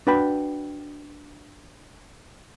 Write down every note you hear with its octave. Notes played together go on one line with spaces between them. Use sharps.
D4 F#4 B4 G5 B5